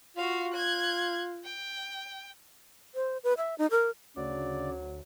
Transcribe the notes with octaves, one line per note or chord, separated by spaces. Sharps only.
F4 F#4 F5
F#6 G#6
G5
C5
B4
E5
D#4
A#4
D2 C#3 F#3 D5